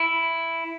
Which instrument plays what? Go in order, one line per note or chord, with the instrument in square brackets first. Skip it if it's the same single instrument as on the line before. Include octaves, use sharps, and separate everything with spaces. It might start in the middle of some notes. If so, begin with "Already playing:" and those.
Already playing: [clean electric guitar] E4